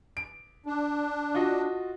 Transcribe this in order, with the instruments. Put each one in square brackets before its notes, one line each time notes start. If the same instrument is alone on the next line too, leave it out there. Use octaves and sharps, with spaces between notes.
[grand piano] D7
[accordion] D4
[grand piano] F4 F#4 D#5